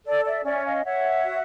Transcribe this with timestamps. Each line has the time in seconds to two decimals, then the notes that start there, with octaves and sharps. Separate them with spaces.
0.05 A4 D5
0.25 D5 E5
0.45 C#4 D5 E5
0.65 D#5 F5
0.84 C#5 E5 F#5
1.24 F#4